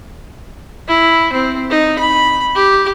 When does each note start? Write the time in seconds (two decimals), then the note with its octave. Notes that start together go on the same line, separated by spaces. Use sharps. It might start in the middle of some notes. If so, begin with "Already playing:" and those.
0.88 E4
1.33 C4
1.70 D#4
1.98 B5
2.55 G4